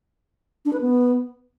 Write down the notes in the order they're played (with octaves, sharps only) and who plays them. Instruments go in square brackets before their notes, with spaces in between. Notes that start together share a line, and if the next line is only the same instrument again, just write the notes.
[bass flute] D4
B4
B3